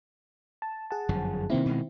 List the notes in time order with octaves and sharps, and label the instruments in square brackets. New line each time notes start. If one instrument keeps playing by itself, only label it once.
[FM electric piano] A5
G#4 F#5 A5
[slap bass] G1 F#2 F3
[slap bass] C3 A#3 [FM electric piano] D#3 C4 E4
[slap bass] B2 G#3